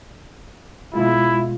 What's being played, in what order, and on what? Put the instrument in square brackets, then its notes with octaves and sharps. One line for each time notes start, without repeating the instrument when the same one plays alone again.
[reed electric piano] B2 G#3 F4 [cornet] E4